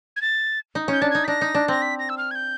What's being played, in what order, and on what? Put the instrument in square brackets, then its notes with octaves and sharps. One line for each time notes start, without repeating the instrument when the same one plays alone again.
[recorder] G#6
A6
[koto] D#4
[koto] C#4 [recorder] G6
[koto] D4 [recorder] A6
[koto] D#4 [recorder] G#6
[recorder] B6
[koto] D4 [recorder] A#6
[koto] D#4
D4
[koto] C4 [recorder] A#6
[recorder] B6
A#6
E6
F6
G#6
G6